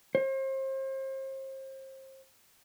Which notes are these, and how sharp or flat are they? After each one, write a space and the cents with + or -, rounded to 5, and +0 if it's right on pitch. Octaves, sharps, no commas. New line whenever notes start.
C5 +35